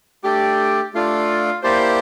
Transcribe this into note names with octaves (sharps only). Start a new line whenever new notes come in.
A3 D4 G4 A4 D5
A3 D4 F4 A4 D5
A#3 E4 G4 C5 D5 A5